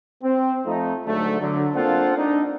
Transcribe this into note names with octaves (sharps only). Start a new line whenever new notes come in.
C4
F2 F3 A3 D#4
G#2 D3 F#3 A3
D3 F#3
A#3 C4 D4 F4 A4 F#5
D4 D#4